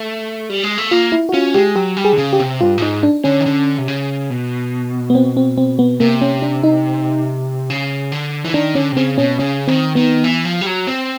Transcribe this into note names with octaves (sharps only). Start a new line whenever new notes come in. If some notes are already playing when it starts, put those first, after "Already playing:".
Already playing: A3
G3
G#3
A3
A#3 F4
E4
F#4
C#4 F4
G#3 G4
F#3 G4
G3
G#4
D3
C#3
G4
C3
G2 F4
A2
G#2 D#4
D4
D3 C#4
D#3
D3
C3
C#3
B2
B3
C4
C4
C4
B3
C3 A#3
C#4
D4
D#4
C#3
D3
E3
D#3 D4
D3 C#4
C3
C#3 C4
B2 C#4
C#3 C#4
D#3 C4
D#3 B3
E3
F3
G3
F#3
C4